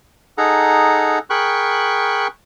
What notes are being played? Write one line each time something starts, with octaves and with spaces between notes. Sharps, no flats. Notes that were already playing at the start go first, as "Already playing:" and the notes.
D#4 G#4 A4 F#5 A#5
G#4 A#4 G5 B5 C#6 F#6